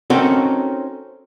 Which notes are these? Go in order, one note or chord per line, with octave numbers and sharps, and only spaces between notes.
C4 C#4 D#4 F#4 A4 A#4